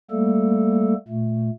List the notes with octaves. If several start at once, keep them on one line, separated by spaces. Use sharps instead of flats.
G3 A3 A#3 A4
A#2 A3